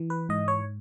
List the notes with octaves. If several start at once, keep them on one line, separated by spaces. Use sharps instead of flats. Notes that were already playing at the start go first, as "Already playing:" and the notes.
Already playing: E3
B4
G#2 D#5
C#5